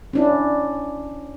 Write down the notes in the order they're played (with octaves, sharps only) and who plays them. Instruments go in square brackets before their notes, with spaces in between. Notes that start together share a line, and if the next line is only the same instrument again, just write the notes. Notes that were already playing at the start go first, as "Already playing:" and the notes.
[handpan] C#4 D4 E4